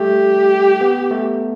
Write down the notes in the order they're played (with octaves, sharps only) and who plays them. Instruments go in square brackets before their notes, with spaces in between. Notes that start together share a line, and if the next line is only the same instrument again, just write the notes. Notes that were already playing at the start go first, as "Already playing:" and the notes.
Already playing: [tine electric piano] G3 A3 [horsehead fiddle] G4
[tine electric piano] B3
A3